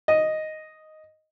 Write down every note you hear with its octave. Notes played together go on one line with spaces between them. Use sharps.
D#5